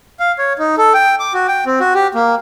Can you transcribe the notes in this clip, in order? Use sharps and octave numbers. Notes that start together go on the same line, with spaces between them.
F5
C#5
D#4
A4
G5
D6
F#4
G5
C4
F#4
G4
A#3